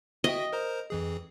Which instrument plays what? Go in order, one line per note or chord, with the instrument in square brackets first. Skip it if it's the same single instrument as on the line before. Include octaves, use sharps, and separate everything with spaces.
[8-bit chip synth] F#4 E5 G5 [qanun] D#5
[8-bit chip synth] A#4 C5 A#5
F2 E3 G#4